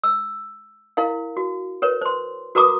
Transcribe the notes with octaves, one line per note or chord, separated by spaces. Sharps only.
E6
E4 A#4 F5
F#4
A#4 B4 C#5
C5 C6
F#4 A#4 B4 A#5 D6 D#6